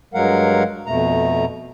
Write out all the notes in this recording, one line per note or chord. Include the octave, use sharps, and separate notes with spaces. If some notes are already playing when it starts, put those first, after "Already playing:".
G2 F#3 G#3 A#4 F5 F#5
F2 B2 A3 A#5